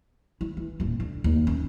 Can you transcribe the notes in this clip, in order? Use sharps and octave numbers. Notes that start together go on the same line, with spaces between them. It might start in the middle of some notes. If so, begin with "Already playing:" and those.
E4
E3
D#1 A2
D3
D#2
C#4